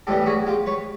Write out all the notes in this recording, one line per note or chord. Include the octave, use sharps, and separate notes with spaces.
A2 E3 G3 B3 G4 A4
F#4 G#4
F4 G4
B4 C#5